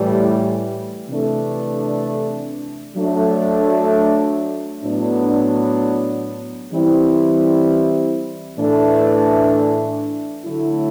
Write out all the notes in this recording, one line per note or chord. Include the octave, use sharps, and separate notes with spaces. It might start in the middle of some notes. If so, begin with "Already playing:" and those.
Already playing: A2 E3 G3
C3 E3 A3 D4
F#3 A3 D4
A2 F#3 B3 D4
E3 G3 C4 E4
A2 E3 A3 D4
D3 F#3 A3 E4